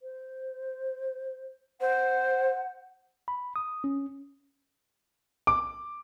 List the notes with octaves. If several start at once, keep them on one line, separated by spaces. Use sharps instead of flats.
C5
C5 F#5
B5
D#6
C#4
D6